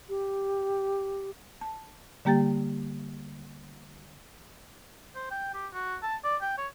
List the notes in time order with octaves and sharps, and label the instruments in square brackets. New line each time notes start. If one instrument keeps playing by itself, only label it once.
[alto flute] G4
[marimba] A5
D3 G3 A#3 G4 G5 A6
[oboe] C5
G5
G4
F#4
A5
D5
G5
C#5